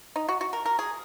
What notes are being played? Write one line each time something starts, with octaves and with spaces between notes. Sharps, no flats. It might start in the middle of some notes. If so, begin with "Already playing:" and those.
D#4
F#4
F#4
A#4
A#4
G#4